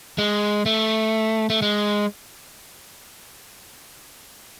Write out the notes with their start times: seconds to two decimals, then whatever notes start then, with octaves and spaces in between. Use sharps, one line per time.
0.18 G#3
0.66 A3
1.50 A3
1.62 G#3